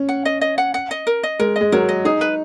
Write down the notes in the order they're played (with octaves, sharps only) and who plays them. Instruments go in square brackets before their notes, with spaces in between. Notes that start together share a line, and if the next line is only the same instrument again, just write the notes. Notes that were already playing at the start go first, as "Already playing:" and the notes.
Already playing: [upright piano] C#4
[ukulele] F#5
D#5
D#5
F#5
F#5
D#5
A#4
D#5
[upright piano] G#3 [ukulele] A#4
[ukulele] D#5
[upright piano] G#3
[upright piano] F#3 [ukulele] A#4
[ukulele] D#5
[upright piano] D#4 [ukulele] G#4
[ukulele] B4